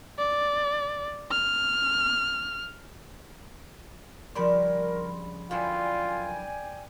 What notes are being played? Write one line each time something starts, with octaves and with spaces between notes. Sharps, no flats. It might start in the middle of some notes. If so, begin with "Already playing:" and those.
D5
F6
C#3 F3 G3 D4 A#4 B5 C6
F#2 D3 E4 F4 D5 G5 G#5